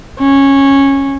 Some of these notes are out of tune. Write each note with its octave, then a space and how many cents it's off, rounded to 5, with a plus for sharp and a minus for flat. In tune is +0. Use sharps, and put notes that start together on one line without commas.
C#4 -10